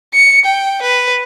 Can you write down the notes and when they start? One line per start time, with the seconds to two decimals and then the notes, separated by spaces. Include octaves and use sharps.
0.14 C#7
0.45 G5
0.82 B4